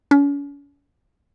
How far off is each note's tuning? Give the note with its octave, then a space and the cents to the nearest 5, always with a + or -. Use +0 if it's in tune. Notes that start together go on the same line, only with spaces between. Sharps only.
C#4 +40